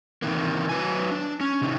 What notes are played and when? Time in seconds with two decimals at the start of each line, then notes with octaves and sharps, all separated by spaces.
0.22 C3 D#3 E3 A#3
0.69 F#3 B4 G#5
1.11 D4
1.41 C#4
1.62 C3 D#3